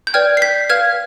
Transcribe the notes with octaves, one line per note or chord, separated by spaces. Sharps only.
G6
B4 D5 G5 F6 G#6
C7
G6 B6
B4 F5 F6 G#6